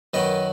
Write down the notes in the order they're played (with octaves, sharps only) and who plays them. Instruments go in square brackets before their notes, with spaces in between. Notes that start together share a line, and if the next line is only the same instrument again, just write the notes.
[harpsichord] F#2 D#3 F#3 B4 D#5